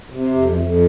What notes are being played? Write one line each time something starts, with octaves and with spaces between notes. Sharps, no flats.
C3
F2
F2